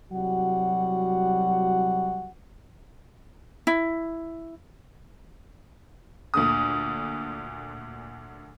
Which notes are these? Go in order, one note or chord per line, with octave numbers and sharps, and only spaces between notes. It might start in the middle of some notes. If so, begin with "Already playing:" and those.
C2 F#3 G3 F#4 F#5
E4
D2 A#2 D3 D#6